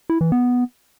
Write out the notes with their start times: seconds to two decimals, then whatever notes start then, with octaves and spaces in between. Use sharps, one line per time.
0.10 E4
0.21 E3
0.32 B3